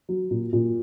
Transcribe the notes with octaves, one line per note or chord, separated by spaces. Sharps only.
F#3
A#2
A#2